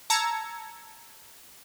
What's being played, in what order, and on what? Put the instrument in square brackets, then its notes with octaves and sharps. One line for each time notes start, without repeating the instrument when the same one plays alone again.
[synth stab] A5 A#5 E6 G#6 C#7